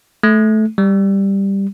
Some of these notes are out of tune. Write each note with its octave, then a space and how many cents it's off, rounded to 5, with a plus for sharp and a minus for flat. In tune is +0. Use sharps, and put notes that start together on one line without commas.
A3 -20
G3 +5